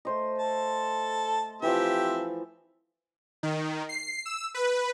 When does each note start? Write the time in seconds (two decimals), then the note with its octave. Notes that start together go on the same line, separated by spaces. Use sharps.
0.05 A3 C5 D#5
0.38 A4 A5
1.62 E3 F3 C4 G4 E5
3.43 D#3
3.89 C7
4.25 E6
4.54 B4